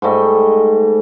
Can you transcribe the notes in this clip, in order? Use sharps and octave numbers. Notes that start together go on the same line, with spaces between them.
G#2 G3 A3 D#5